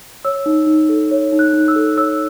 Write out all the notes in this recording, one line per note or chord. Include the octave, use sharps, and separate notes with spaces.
C#5 E6
D#4
D#4
A4
C#5
D#4
F#6
D#4
E6
A4
C#5 E6